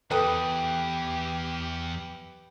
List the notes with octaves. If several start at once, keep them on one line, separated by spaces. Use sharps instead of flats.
E2 G4 A4 B4 G5 D#6